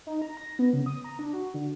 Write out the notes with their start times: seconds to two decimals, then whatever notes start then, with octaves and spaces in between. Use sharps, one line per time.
0.07 D#4
0.22 A#5
0.37 A#6
0.59 B3
0.73 C#3
0.86 D#6
1.04 A#5
1.19 D4
1.33 F#4
1.54 D3